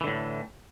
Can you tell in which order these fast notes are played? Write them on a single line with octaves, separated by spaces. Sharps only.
E3 D3 A2